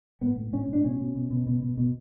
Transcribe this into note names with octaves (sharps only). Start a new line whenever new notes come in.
A2 B3
A2
A2 C#4
A2 D4
B2 C#4
B2
B2
B2
B2
B2
B2